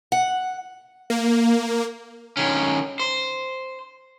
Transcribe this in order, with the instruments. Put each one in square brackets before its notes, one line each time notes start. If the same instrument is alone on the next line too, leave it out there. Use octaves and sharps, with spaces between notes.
[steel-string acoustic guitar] F#5
[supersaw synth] A#3
[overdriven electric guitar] D#3 C#4
C5